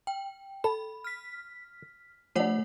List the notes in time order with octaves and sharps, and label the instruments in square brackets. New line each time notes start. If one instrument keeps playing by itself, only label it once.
[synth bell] G5
[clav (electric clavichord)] A4 [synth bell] B5
[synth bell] F6 B6
[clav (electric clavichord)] F3 D4 [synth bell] A3 C#5 F#5